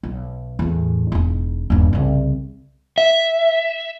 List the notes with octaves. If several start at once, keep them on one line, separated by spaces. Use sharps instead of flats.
B1
E2 A2
E1 D#4
D#1 G2
C2 C#3
E5